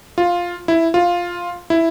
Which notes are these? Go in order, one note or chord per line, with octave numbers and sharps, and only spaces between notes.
F4
E4
F4
E4